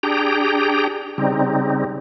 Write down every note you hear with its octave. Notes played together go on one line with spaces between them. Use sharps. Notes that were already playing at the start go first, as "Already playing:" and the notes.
D4 G4 G#4 G5 A#5
C#3 G3 C4 D#4